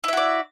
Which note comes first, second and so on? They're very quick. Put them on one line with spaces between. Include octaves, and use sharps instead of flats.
E4 E5 F#4 D5